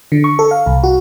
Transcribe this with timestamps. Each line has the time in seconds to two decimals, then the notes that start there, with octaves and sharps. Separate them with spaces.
0.12 D3
0.24 C#6
0.39 A4
0.51 F5
0.66 C2
0.84 F#4